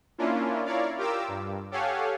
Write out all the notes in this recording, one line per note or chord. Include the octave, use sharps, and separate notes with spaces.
A#3 C#4 D4 E4 F4
E4 A#4 C#5 D5 F5
F4 G4 A#4 D6 E6
G2
G4 A4 C#5 F5 F#5 G#5